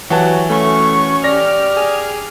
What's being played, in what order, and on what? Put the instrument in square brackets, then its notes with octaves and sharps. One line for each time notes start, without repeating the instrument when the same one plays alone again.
[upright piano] E3 A5 [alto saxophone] F#3 [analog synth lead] F#4 [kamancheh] G4
[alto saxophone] A3 [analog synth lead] C#4 [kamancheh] F#4 C#6
[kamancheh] G4 F6 [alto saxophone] D5 [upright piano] A#6
[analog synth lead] G#4